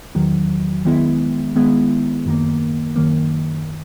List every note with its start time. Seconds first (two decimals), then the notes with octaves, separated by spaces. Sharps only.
0.15 E2 D#3 F#3
0.85 D#3 G#3 B3 E4
1.55 D#3 G#3 B3 E4
2.26 F#2 D#3 A#3
2.96 F#2 D#3 A#3